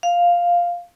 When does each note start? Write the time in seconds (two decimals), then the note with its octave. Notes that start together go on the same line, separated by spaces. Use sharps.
0.03 F5